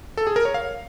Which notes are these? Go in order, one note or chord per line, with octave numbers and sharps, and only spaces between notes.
A4
G#4
A#4
C#5
F5